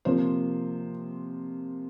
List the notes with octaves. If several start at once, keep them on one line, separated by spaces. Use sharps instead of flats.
C3 F3 A#3 C5